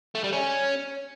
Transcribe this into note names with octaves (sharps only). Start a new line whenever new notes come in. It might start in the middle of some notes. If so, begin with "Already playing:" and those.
A3
G3
C#4